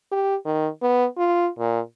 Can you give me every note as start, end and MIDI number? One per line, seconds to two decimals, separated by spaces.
0.11 0.35 67
0.45 0.68 51
0.82 1.06 59
1.17 1.49 65
1.59 1.80 46